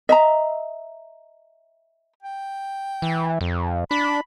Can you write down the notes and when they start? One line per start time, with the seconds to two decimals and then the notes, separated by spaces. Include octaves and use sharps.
0.09 D#5 E5 A#5
2.23 G5
3.02 E3
3.41 F2
3.91 D4 B5